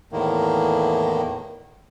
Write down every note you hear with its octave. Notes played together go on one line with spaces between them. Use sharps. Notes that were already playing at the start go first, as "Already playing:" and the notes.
E2 A2 D#3 A#3